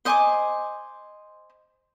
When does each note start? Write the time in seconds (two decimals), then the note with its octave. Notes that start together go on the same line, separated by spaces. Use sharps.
0.05 C5 D#5 G#5 D6